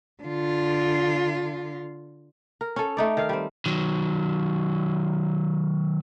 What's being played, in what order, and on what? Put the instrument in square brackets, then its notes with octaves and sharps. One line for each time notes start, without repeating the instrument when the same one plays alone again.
[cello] D3 F4
[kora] A#4
C#4 A4
A3 D#4 D5
D#3 F5
G3 C4
[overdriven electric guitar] D#3 F#3